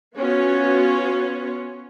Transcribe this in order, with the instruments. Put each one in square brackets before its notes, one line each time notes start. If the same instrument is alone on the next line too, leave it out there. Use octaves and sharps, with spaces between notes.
[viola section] B3 C#4 F4 F#4 C#5